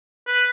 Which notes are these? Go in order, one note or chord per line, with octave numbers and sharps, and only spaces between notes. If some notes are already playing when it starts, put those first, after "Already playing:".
B4